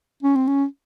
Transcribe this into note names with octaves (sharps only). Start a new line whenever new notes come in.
C#4
C4
C#4